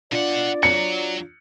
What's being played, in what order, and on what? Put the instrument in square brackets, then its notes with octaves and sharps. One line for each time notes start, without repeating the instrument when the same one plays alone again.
[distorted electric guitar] B2 F#5 [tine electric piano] D4 F4 [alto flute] D5
[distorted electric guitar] F#3 [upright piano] C#7